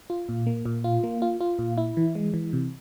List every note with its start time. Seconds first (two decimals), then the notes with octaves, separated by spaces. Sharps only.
0.10 F4
0.29 A#2
0.47 A#3
0.66 A#2
0.84 F4
1.04 A#3
1.22 F4
1.41 F4
1.59 A#2
1.78 E4
1.97 E3
2.15 G#3
2.34 E3
2.53 C3